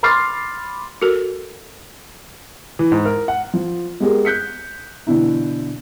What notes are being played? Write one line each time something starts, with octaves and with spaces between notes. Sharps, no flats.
B5 C6 D6 F6 A6 C7
F#4 A4 A#4
E3
G#2
A#4
F#5
F3
G#3 B3 G4 G#4 A#4
F#6 G6 B6 C#7
B2 D3 E3 E4